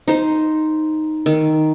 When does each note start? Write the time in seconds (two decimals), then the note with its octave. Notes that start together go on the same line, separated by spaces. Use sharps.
0.08 D#4 C5
1.26 D#3